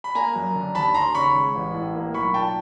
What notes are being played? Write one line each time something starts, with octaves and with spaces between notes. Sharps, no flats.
B5
A#3 G#5 A#5
F#2
D3
D#2 A5 B5
D#2 A#5 C6
C#3 B5 C#6
G#3
A1
A2
A#3
B1 B5 C#6
A#2 G5 A5